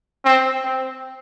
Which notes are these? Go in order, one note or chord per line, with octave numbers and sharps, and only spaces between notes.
C4
C4